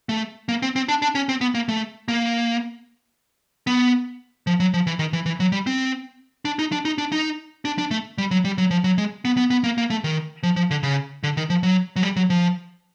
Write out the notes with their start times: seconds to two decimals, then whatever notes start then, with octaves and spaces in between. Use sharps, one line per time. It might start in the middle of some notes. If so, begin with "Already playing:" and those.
0.09 A3
0.49 A#3
0.62 C4
0.76 C4
0.89 D4
1.02 D4
1.15 C#4
1.29 C4
1.41 B3
1.55 A#3
1.68 A3
2.08 A#3
3.67 B3
4.47 F3
4.60 F#3
4.74 F3
4.87 E3
4.99 D#3
5.13 E3
5.26 E3
5.40 F#3
5.52 G3
5.67 C4
6.45 D4
6.59 D#4
6.72 D4
6.85 D#4
6.98 D4
7.12 D#4
7.65 D4
7.78 D4
7.91 A3
8.18 G3
8.31 F#3
8.45 G3
8.58 F#3
8.71 F3
8.84 F#3
8.98 G#3
9.25 B3
9.37 B3
9.51 B3
9.64 A#3
9.78 A#3
9.90 A3
10.04 D#3
10.43 F3
10.56 F3
10.71 D3
10.83 C#3
11.23 D3
11.37 D#3
11.50 F3
11.63 F#3
11.96 F#3
12.03 G3
12.16 F#3
12.30 F3